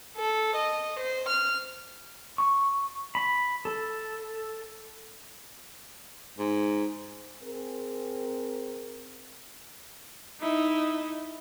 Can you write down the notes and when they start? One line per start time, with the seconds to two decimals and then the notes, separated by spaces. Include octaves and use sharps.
0.16 A4
0.56 D#5
0.99 C5
1.29 F6
2.38 C#6
3.15 B5
3.65 A4
6.39 G#2
7.42 C4 G#4 A#4
10.40 D#4 E4